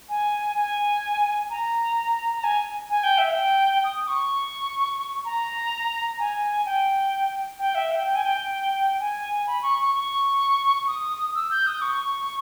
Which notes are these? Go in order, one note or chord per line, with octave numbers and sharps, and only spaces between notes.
G#5
G#5
A#5
A#5
G#5
G#5
G5
E5
G5
D#6
C#6
A#5
G#5
G5
G5
E5
G5
G5
G#5
G5
G#5
B5
C#6
C#6
C#6
D#6
E6
G6
D#6
C#6